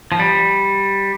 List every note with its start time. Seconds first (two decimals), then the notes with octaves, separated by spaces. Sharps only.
0.12 F3
0.19 G3